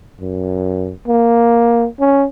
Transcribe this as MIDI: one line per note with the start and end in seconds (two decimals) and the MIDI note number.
0.21 0.93 42
1.08 1.87 58
2.00 2.26 61